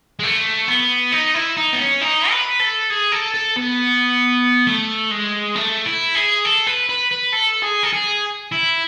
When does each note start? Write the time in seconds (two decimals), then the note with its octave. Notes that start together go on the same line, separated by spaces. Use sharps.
0.19 G#3
0.23 A3
0.68 B3
1.12 D#4
1.34 E4
1.57 D#4
1.73 B3
1.79 C#4
2.01 D#4
2.30 B4
2.60 A4
2.90 G#4
3.12 A4
3.34 A4
3.57 B3
4.67 A3
5.11 G#3
5.56 A3
5.85 E4
6.15 G#4
6.45 A4
6.67 B4
6.89 B4
7.11 B4
7.33 A4
7.62 G#4
7.83 A4
7.93 G#4
8.52 E4